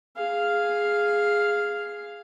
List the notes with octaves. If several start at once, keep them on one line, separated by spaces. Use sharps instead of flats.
G#4 F5